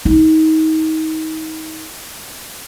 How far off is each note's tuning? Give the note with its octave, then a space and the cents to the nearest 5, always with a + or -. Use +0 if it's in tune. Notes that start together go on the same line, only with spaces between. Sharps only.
D#4 +30